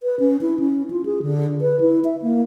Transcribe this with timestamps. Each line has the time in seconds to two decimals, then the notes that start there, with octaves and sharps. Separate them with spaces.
0.03 B4
0.20 C#4
0.41 E4
0.60 C#4
0.91 F4
1.06 G#4
1.22 D3
1.61 B4
1.81 E4
2.05 E5
2.22 A#3